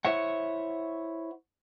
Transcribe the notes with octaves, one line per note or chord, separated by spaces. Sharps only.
E4 C5 C#5 E5 F#5